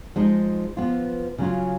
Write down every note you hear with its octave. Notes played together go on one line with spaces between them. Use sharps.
F3 G#3 D#4
F3 B3 F4
C#3 F#3 C#4 F4